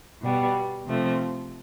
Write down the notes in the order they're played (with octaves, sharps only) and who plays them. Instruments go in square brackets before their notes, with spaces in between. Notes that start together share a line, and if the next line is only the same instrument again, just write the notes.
[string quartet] B2 G3 B3
C3 F3 A3 C4